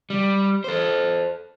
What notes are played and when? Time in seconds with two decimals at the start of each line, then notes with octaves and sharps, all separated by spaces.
0.10 G3
0.64 A4 C5